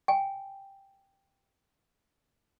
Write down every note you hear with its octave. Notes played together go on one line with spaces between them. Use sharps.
G5 G#5